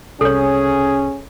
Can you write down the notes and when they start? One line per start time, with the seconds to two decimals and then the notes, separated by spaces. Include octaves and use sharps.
0.21 C2 C#4 G#4 A4 C#5